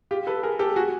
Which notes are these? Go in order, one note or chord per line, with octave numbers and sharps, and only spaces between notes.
F4 G4
A4 B4
G#4 A#4
G4 A4
F#4 G#4